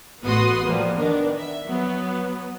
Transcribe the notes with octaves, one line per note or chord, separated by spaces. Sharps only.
A1 B3 F#4 B4 C6 D#6
F3 G3 A#3 B3
D#3 B3 D4 A#4
E5
F#3 B3